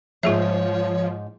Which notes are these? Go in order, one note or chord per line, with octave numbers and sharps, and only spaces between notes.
F2 G#2 F3 F4 G#4 C#5 E5